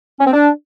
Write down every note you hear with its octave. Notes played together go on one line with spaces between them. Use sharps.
C#4
C4
D4